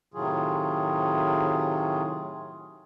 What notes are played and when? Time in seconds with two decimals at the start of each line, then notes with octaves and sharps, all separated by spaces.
0.14 A2 C3 D#3 F#3 F4 G#4